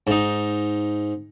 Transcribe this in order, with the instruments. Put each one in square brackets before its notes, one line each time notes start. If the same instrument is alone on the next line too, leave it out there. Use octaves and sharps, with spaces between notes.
[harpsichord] G#2 D#4